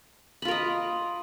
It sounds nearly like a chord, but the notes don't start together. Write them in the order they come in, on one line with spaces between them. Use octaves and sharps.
B5 F4 A#4 D#5